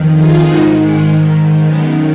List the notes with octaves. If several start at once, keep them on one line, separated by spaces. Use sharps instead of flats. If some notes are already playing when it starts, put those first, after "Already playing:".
Already playing: F2 D#3
F4 G#4
G#2 D#3 D#4 F#4
G#3
G#2 D#3
F#2 D#3 G#3 B3